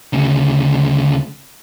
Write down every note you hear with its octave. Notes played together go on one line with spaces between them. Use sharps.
D2 C#3